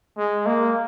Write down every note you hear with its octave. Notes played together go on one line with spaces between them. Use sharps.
G#3
A#3